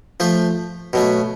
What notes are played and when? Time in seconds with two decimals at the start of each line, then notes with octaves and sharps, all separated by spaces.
0.20 F3 A3 F4
0.93 B2 F#3 A3